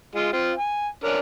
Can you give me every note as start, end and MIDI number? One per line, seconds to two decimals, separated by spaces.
0.15 0.31 56
0.15 0.31 65
0.33 0.52 60
0.33 0.52 65
0.58 0.88 80
1.04 1.19 61
1.04 1.19 62
1.04 1.19 70